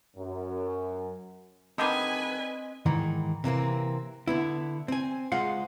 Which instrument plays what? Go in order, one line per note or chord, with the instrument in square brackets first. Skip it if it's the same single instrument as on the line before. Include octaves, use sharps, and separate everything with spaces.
[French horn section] F#2
[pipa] D3 D#3 G3 [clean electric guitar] C4 D#5 [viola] B4 G#5
[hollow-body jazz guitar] G#2 D#3 E3
C3 E3 A#3 C4
D3 B3 E4
C4 G#5
C#2 G#3 F4 C5 F5 F#5